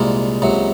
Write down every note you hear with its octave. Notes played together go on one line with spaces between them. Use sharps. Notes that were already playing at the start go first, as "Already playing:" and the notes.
Already playing: C2 A#2 G#3 A#3
C#2 C3 F#3